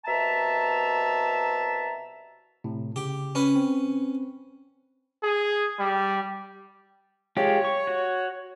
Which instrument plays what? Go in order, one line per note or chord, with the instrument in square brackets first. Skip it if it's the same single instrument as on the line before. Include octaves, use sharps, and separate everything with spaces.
[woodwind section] C2 B2 E5 A5 A#5
[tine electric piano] A2 C3
[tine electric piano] C#3 [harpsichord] G4
[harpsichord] C#4 B4
[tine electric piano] C4
[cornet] G#4
G3
[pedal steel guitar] G#3 F4 G4 [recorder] C#5
[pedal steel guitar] C#6
F#4